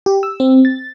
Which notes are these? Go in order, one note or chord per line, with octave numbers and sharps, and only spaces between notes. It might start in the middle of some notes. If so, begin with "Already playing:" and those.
G4
E6
C4
A6